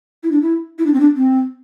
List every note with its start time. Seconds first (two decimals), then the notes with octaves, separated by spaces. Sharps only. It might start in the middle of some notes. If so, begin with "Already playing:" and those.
0.23 E4
0.31 D4
0.42 E4
0.78 E4
0.86 D4
0.93 C4
0.99 D4
1.16 C4